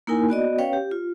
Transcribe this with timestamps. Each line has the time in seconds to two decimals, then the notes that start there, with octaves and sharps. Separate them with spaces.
0.07 A#3 D#4 E4 A#4 G#5
0.29 B3 F#4 D5 D#5
0.58 C#4 B4 C#5 F5 G5
0.73 G4
0.91 F4